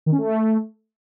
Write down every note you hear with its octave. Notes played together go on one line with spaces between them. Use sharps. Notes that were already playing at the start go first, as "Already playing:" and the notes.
D#3
C#4
A3